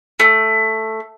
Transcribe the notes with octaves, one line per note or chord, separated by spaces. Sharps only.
A3